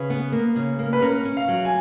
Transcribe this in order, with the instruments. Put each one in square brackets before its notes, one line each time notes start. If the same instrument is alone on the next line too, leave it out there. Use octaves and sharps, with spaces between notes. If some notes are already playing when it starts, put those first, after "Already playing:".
Already playing: [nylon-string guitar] C#3 [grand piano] B4
[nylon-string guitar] B3
A#3
C#3
A#3
[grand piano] B4
[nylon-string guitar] C#4 [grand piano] A#4
[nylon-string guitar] C#4
[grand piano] F5
[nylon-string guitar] F#3
[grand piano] G#5